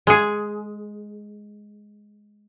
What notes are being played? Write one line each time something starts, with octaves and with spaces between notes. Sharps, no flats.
G#3 G#4